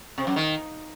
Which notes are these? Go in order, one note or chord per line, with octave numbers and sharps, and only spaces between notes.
C3
F#2
D#3